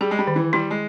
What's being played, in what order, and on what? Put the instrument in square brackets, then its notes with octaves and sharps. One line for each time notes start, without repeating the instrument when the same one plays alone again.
[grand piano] G3 [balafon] G#4
[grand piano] G#3
G3
[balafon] D#3
[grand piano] E3
[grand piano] G3 [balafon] E4
[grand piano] G#3